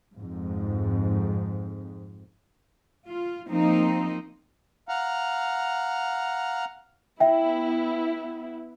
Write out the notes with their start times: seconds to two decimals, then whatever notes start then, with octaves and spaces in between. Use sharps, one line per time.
0.16 F2 G#2
3.07 F4
3.50 F3 A#3 C4 D#4
4.89 F5 F#5 A#5
7.20 B3 E4 E5 G5